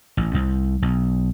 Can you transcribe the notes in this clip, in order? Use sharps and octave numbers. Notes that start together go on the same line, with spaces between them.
A1
C2
B1